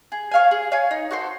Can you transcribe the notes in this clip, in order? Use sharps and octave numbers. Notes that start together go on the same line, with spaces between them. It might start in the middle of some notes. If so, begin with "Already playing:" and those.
G#4
C#5 F5 G#5
G#4
C#5 F5 G#5
D#4
F#4 A4 C5